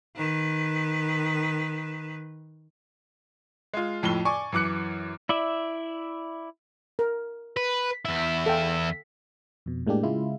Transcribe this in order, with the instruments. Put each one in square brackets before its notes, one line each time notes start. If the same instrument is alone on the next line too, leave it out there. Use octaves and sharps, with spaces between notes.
[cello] D#3 B4
[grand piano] G#3 F4
F2 A2 F3 G7
D5 G#5 C#6 D6
F#2 E3 D6 F#6 C#7
[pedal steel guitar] E4 D5 E5
[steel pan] A#4
[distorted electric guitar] B4
E2 E4
[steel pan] A4 F5 G5
[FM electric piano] F2 B2
A2 G#3 A#3 D4 G4
C#3 G#3 E4 F4